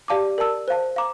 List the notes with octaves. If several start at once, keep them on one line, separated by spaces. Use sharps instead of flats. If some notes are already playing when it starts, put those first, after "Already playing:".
G4 D5 F5 A5 D6
A#4 D5 A5 E6
C5 F5 A5
F5 A#5 D6